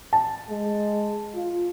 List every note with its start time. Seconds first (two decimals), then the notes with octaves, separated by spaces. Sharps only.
0.13 A5
0.50 G#3
1.36 F4